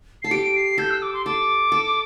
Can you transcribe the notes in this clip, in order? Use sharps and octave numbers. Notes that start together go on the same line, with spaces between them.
A4 C7
G4 D7
C7
A4 G6
E6
D6
C6
A4 D6
A4